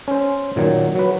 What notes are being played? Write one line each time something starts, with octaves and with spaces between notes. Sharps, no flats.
C#4 C5
A#2 D#3 F#3
F#3 B4